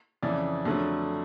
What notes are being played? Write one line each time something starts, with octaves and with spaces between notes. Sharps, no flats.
F2 C#3 E3 D5
F2 D3 F#3 A3 D4